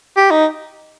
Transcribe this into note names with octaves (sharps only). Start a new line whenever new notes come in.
G4
D#4